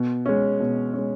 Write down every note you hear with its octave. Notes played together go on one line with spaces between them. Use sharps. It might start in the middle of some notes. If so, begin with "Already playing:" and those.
Already playing: B2
G#3 C#4
B2
G#3 C#4